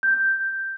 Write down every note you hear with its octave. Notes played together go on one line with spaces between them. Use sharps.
G6